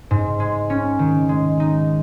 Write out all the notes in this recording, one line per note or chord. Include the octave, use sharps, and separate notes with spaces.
G#2
G#3
C#4
D#3
G#3
D#4